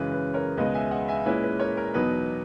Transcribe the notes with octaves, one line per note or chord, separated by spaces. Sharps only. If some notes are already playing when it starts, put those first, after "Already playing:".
Already playing: F#2 C#3 E3 G#3 B4
B4
A#4 C#5
C#2 B2 G#3 B4 D#5
E5 G#5
D#5 F#5
E5 G#5
A#2 G#3 C#4 E4 B4
B4
A#4 C#5
A#4
E2 B2 F#3 B3 D#4 B4